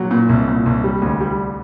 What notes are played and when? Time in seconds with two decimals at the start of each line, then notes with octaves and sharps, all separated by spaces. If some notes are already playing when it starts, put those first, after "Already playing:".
Already playing: A#2 F#3
0.11 A#2
0.29 C2
0.48 A#2
0.66 C2
0.84 G3
1.02 D2
1.21 G3